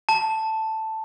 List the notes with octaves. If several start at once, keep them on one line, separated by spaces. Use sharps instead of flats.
A5